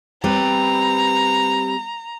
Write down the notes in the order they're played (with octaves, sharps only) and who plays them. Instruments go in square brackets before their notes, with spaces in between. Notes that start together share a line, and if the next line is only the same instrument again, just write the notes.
[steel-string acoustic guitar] G3 C4 B4 [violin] A#5